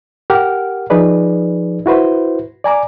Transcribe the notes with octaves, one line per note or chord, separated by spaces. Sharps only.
G4 A#4 F#5 F6
F3 D#4 G#4 B4 D5
E4 F#4 B4 C5
D5 G#5 A#5 D6